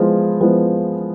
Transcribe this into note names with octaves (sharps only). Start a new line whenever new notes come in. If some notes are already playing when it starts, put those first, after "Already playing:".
Already playing: F3 G#3 B3 E4
F3 G#3 B3 E4